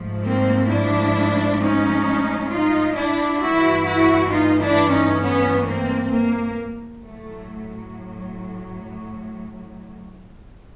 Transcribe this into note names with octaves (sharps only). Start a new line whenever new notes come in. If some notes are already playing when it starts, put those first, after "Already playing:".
Already playing: G#2 F3 A3
A#3 C4
D4 E4
C#4 D#4
D#4 F4
D4 E4
G2 E3 A3 E4 F#4
E4 F#4
D#4 F4
D4 E4
C#4 D#4
B3 C#4
A#3 C4
A#3
A2 F#3 A3